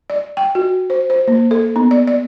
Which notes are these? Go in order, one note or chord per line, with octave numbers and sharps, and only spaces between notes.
D5
G5
F#4
C5
C5
A#3
A4
B3
D5
D5